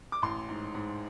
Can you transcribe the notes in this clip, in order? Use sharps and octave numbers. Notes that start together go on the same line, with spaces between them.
D6
A1 C6
G#2
G#2